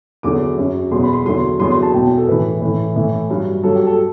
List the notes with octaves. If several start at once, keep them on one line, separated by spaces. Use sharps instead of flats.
E2 D3 F#3 D6
F#2 F#3
E2 B2 F#3 C6
B5
C6
E2 D3 F#3 C6
E2 D3 F#3 C6
C6
A5
E2 B2 F#3 G5
A4
A2 E3 B4
A2 E3
A2 E3
G2 F#3
G2 F#3 A4
G4
A4